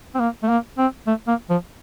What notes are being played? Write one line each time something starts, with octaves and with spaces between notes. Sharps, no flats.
C4
A#3
A3
A#3
C4
A3
A#3
F3